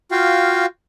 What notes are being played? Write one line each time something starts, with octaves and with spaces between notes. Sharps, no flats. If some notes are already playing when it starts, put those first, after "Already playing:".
F4 F#4 F5 G5